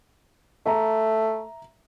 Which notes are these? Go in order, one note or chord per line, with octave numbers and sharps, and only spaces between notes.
A3 E5 A#5